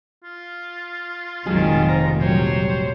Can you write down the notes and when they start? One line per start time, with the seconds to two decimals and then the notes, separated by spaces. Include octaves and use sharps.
0.24 F4
1.46 F1 A#1 A#2 D#3 F#3 G#3 G#4
1.88 C5 A#5
2.21 F#3 G3 C5 C#5